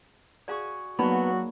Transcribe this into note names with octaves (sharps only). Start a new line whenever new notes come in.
F#4 G#4 D5 F5 C#6
F#3 A#3 B3 D#4 F#4 D5 B5